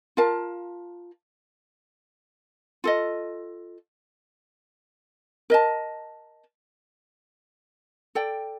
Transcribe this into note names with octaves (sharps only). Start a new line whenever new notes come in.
F4 A#4 F5 A5
F4 A4 D#5
A#4 D#5 A5
A4 D5 G5